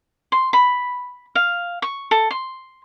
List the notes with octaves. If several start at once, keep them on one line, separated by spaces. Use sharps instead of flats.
C6
B5
F5
C#6
A4
C6